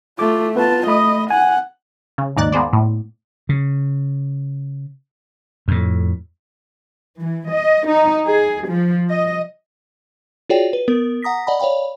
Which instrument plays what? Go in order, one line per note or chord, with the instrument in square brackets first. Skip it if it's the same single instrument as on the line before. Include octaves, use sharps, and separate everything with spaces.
[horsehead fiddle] A3 F4 [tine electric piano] D6
[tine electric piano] B3 B4 [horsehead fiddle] F4 A5
[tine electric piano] A3 B5 D#6 [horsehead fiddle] D#5
[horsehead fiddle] F#5 [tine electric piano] G#5
[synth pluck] C#3
D#2 G#2 D#4 D5 F#6 A6
A#3 B3 G#4 C5 D5
A2
[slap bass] C#3
F2 A2
[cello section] E3
D#5
D#4
G#4
F3
D#5
[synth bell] F4 F#4 G#4 C#5 D5 G5
B4
B3 A#4
F#5 A#5 D#6 A#6 B6
D5 D#5 F#5 A5 B5
C#5 D5 F5 G5 B5